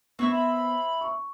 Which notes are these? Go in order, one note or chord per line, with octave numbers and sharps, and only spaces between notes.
B3 C4 E4 E5 C#6
B5
C#6